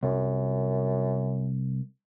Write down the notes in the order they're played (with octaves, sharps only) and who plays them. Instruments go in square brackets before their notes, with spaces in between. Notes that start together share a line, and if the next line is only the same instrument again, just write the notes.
[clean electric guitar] C2 [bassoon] F#2